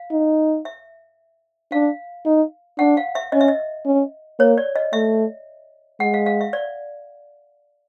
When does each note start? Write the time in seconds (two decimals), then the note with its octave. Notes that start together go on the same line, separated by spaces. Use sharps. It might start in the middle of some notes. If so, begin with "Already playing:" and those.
Already playing: F5
0.11 D#4
0.65 E5
1.72 D4 F5
2.26 D#4
2.79 D4 F#5
2.97 F5
3.15 E5
3.32 C#4 D#5
3.41 E5
3.48 D#5
3.86 C#4
4.39 A#3 C#5
4.58 D5
4.76 D#5
4.93 A3 E5
6.00 G#3 F#5
6.14 F5
6.26 F5
6.41 E5
6.53 D5